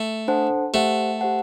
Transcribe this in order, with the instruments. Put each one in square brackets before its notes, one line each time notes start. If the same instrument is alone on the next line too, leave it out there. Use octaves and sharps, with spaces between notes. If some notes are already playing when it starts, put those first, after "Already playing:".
Already playing: [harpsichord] A3
[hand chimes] D4 A4 C5 F#5 A5
[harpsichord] A3 [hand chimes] G4 C5 F#5 A5
[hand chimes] G4 C5 F#5 A5